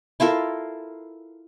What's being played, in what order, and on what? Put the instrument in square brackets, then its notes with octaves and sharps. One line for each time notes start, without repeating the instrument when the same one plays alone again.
[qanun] E4 F4 A4 A#4